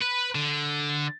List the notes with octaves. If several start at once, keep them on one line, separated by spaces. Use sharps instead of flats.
B4
D3